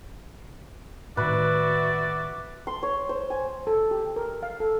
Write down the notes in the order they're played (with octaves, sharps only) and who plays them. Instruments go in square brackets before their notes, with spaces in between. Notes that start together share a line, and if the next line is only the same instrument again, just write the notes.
[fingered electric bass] A2 D#3 [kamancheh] F#4 E5 [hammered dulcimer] B4 [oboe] D5
[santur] C6
C#5
C5
G#5
[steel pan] A4
G4
A#4
F5
A4